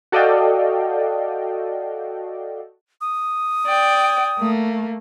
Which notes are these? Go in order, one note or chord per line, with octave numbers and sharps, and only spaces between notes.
F#4 A4 D5 D#5 F5 G5
D#6
D5 G5
A3 A#3